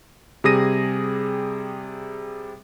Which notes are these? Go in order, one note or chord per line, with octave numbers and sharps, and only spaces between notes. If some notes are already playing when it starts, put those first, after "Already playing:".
C3 G3 G#4 D#6 A#6 D#7